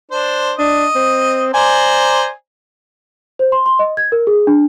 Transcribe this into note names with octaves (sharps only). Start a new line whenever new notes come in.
D4 C5
D4 D#5
C4
C5 D5 G#5 A#5
C5
C6
C6
D#5
G#6
A#4
G#4
D4